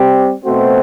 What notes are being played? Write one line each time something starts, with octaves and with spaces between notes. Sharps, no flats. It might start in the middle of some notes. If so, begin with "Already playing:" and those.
Already playing: G3 C4 G4
B2 A3 C4 F#4 C5